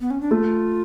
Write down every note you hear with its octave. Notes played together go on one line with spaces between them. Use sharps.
B3
C#4
D4
A3 F4